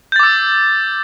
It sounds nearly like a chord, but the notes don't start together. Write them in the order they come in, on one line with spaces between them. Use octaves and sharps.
G6 A6 D6 E6